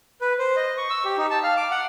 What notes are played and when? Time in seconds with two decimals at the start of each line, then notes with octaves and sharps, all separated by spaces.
0.21 B4
0.39 C5
0.56 D#5
0.77 C#6
0.90 E6
1.05 G4
1.18 D#4
1.31 A5
1.43 F5
1.57 D6
1.71 F#5